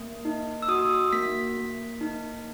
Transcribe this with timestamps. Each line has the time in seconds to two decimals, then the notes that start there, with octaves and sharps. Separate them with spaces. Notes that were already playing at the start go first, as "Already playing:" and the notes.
Already playing: A#3
0.25 D#4
0.62 E6
0.68 F#4 D#6
1.13 A#3 B6
1.57 A#3
2.01 D#4